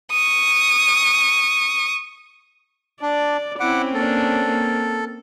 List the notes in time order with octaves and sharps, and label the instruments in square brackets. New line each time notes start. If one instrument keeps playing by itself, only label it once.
[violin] C#6 D#6
[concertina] D4 [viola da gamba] D5
[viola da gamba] C4 C#4 [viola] E4 [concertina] F#5 D6
[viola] A#3 D4 [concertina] A4
[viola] A#3